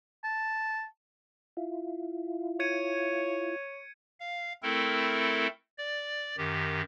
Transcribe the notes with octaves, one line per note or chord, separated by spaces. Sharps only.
A5
E4 F4
C#5 G#6 C#7 D#7
F5
A3 C4 E4 A4 A#4
D5
F#2 D#3 G4